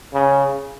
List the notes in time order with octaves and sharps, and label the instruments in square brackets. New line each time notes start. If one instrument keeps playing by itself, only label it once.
[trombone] C#3